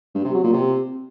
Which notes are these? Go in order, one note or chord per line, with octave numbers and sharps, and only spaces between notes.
G2
C3
F#3
A#2
C3